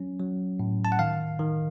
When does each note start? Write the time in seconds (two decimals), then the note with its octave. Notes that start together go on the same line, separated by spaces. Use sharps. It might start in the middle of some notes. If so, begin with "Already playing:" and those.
Already playing: F#3 C#4
0.20 F#3
0.59 A2
0.85 A5
0.92 F#5
0.99 D#3 F5
1.39 D#3